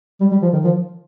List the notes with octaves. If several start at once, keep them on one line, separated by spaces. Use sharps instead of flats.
G3
G3
F3
D#3
F3